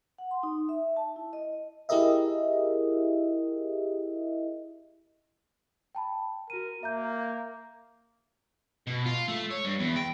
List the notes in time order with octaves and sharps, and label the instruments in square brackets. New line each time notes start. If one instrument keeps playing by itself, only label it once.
[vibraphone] F#5
C6
D#4
E5
A5
E4
D#5
[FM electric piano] E4 G4 G#4 A#4 D#5 E5
[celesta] G5 A5 B5
[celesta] F#4 D#7 [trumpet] A#4
[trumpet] A#3 [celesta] E5 A#5 G6
[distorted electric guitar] B2
F4
A3
C#5
G2
E2
G5